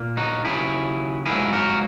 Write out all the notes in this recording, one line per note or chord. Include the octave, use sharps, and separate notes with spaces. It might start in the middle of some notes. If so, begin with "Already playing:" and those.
Already playing: A#2 A#3
D#4 F#4
D#2 C#3 F#3 E4 G#4
G#2 F#3 A#3 E4 G#4
F#4 A#4